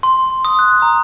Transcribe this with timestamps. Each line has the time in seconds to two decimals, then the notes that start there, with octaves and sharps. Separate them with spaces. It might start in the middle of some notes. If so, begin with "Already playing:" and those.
0.03 C6
0.45 D#6
0.59 F#6
0.82 A#5